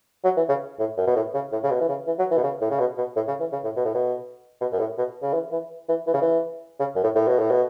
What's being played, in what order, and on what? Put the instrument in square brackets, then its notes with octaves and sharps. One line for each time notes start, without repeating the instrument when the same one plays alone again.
[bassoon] F#3
E3
C#3
A2
F#2
B2
A2
C#3
A2
C#3
B2
E3
C#3
E3
F#3
E3
B2
C#3
A2
C#3
B2
B2
A2
C#3
E3
C#3
A2
B2
A2
B2
B2
F#2
A2
B2
C#3
E3
E3
E3
E3
C#3
E3
C#3
F#2
A2
A2
B2
A2
B2